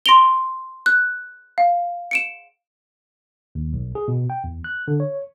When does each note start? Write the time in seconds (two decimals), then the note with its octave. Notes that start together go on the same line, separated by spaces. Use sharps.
0.06 C6 A#6 D7 F7 G7
0.86 F#6
1.58 F5
2.11 C#7 D7 E7
3.55 D#2
3.73 B1
3.95 G#4
4.08 B2
4.30 G5
4.44 E2
4.64 F#6
4.88 D3
5.00 C#5